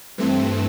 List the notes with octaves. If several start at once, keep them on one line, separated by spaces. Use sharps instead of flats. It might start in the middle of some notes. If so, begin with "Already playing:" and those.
G2 E3 A3 C4